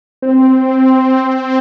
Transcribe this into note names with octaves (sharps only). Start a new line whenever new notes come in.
C4